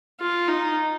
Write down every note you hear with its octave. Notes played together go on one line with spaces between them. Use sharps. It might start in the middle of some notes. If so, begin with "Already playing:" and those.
F4
D#4